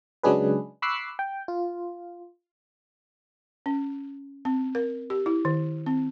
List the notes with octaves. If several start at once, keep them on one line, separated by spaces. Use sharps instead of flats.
C#3 F#3 G#3 D4 G#4 B4
B5 C#6 D6 E6 F#6 C7
G5
F4
C#4
C4
A#4
G4
E4
D#3
C4